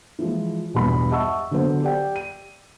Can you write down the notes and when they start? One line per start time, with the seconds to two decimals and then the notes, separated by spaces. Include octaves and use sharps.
0.19 E3 F3 G#3
0.74 B1 E2 G2 B5
1.11 D#5 E5 F#5 A5 C#6 E6
1.51 D3 F#3 B3 C5
1.82 G4 D5 G5
2.16 D#7